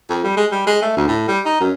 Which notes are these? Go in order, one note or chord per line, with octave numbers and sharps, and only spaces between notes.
F2
G3
G#3
G3
G#3
A3
D2
A2
G3
D#4
F#2